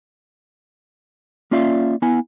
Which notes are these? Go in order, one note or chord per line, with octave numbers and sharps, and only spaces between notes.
A#3 C#4 F4 D5 E5 F5
B3 E4 F#5 G#5